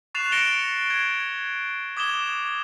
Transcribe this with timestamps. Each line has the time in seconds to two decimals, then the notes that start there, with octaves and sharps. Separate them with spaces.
0.15 C#6 F#6 A6 C7 E7 F7
0.32 A6 A#6 C#7 D7 E7 G7
0.90 G#6
1.97 D6 D#6 G#6 E7 G7